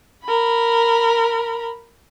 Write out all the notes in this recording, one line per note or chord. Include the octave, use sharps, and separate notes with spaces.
A#4 B5